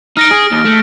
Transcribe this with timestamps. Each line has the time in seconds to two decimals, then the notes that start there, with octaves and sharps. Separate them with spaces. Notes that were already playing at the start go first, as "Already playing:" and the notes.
0.17 D#4 F6 A#6 D7
0.31 G#4
0.51 D#2
0.65 A3